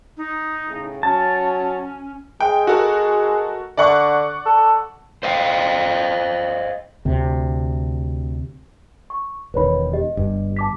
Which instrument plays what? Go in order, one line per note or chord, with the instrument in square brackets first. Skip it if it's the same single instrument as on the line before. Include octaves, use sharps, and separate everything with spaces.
[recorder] D#4
[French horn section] A2 C#3
[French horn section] F#3 [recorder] C#4 [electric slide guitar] A5
[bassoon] G#3 [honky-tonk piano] G5
[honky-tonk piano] F#4 A4 A#4
[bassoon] D3 [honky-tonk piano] D5 F#5 C#6
[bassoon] A4
[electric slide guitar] C5 D#5 F5 G5
[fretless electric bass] D2 C3
[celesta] C#6
[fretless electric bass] E1 D#3 [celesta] B4 C#5 B5
[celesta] G4 D#5
[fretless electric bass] G1 G2
[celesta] A5 D6 B6